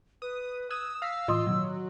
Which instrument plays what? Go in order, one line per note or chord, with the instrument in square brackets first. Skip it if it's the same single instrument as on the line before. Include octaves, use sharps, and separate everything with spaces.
[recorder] B4 [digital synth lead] D#6
[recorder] D#6 [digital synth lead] E6 [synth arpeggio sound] F#6 G#6 D#7
[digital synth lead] F5 [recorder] E6 [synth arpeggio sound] F6 A#6 B6
[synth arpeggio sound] A2 E3 [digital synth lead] F4 [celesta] D#5 C6 D#6
[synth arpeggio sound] B2 D#3 [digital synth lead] F#3